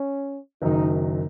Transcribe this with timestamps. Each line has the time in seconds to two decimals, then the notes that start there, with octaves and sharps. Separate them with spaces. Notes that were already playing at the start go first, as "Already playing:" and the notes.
Already playing: C#4
0.62 F#1 F#2 D#3 F#3 D#4